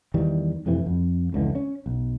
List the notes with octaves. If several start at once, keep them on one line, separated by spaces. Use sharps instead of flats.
E2 D#3 E3 G3
F2 A2 C3 E3
F2
F1 C#2 D3 E3
C#4
B1